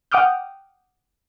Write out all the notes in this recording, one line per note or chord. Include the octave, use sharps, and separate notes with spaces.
F#5 G5 D6 D#6 F6 G6